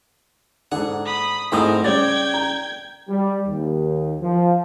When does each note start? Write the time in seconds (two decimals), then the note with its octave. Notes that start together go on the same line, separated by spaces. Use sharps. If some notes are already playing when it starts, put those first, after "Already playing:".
0.72 G#2 D3 G#4 F#5
1.05 B5 D#6
1.52 G#2 A3 C4 E4 A4 A#4 D5 D#6
1.84 C#3 G3 C#5 D5 G5 G#6
2.34 A#5
3.09 G3
3.47 D#2
4.21 F3